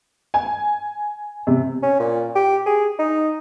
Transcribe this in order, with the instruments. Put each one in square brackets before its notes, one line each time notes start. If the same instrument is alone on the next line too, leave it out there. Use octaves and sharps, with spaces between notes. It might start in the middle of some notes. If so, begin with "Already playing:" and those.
[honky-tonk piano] G#5
C3
[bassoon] C#4
A#2
G4
G#4
D#4